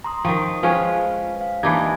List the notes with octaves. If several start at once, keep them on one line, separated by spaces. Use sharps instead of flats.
A#5 C6 D#6
D#3 F3 G5 C#6 D#6
F3 G#3 C#4 F4 B4 F5
F5
E3 A#3 D4 D#4 G4 G#6